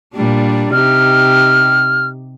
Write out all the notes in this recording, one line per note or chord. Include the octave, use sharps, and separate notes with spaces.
A#2 G3 D4
C3 D#4 G4 F6